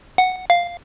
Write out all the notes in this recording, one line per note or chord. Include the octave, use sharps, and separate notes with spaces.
F#5
F5